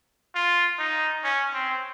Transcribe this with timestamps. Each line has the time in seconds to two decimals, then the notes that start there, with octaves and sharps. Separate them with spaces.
0.35 F4
0.79 D#4
1.24 C#4
1.53 C4